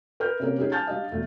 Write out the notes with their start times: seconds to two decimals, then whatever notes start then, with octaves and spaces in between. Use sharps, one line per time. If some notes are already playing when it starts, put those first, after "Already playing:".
0.20 A#4 B4 F6 G6
0.40 C3 A#3 C#4 G4 A#4
0.58 G3 C#4 D#4 G4 G#4
0.72 G#5 A5 F6 G6 A6
0.87 G3 D4 G4 D#5 F5
1.12 E1 A3